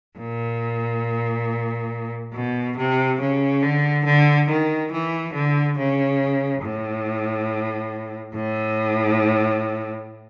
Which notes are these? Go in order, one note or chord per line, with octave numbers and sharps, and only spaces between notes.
A#2
B2
C3
C#3
D3
D3
D#3
E3
D3
C#3
A2
A2